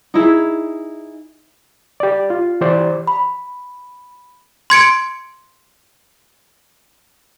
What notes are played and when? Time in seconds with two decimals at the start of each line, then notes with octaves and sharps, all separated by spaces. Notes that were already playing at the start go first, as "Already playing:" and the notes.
0.14 D#4 E4 G#4
2.00 G4 D5
2.30 F4
2.61 E3 G4 C5 D5
3.07 B5
4.70 C6 G#6 C#7 D7